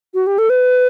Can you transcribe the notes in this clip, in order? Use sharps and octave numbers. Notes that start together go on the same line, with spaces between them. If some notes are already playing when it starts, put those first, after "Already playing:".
F#4
G4
A4
B4